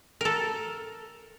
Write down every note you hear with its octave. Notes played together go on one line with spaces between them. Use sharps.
A4 A#4